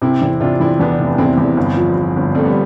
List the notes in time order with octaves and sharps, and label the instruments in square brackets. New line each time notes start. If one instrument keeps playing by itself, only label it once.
[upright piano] C3 [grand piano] C4 E4
[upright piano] E2 [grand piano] C4 E4
[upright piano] C3 [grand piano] D4 F4
[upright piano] E2 [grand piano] C4 E4
[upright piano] E2 [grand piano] B3 D4
[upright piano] F1
[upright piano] E2 [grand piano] C4 E4
[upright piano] E2
G1
F3
F3
G1
[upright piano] G2 [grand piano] A3 C4
[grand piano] G3 B3